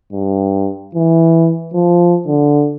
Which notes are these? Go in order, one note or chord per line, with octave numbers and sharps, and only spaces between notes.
G2
E3
F3
D3